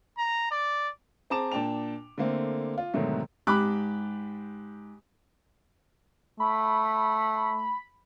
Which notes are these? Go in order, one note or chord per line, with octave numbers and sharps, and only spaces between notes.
A#5
D5
C4 G#4 A5 A#5 D6 E7
A#2 D4 G5 A5 F7
D3 A3 A#3 C4
F4
G#2 B2 D3 D#3 F#3 A3
G#2 G4 B5 D6 F#6
A3 B5